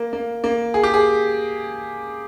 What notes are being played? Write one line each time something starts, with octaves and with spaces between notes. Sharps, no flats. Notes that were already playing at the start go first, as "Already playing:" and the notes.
Already playing: A#3
A#3
A#3
G#4
G4
G#4